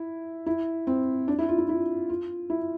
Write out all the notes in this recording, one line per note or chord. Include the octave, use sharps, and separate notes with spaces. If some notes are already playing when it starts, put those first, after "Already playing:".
Already playing: E4
E4
C4
D4
E4
F4
E4
E4
F4
E4